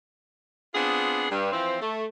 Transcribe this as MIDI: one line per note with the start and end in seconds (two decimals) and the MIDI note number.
0.75 1.26 59
0.75 1.26 60
0.75 1.26 62
0.75 1.26 65
0.75 1.26 68
1.31 1.51 43
1.52 1.76 52
1.52 1.76 53
1.52 1.76 60
1.81 2.04 57